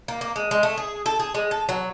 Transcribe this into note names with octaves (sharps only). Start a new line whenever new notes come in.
A#3
A#3
G#3
G#3
A3
G#4
A4
G#4
G#3
A4
F#3